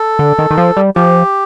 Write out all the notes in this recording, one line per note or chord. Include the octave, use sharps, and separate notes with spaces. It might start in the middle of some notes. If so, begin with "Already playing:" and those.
Already playing: A4
D3
D#3
D#3
F3
G3
F3 G4